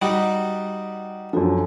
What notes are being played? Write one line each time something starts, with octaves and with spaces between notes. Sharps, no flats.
G3 D#4 F#4
F#2 F3 F#4 A4